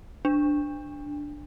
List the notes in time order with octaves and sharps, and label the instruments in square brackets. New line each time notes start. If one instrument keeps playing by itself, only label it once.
[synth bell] D4